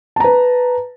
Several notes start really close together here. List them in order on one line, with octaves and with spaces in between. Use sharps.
A5 A#5 B4